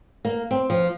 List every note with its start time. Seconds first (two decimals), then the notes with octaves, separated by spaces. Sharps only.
0.25 A#3
0.51 C4
0.70 F3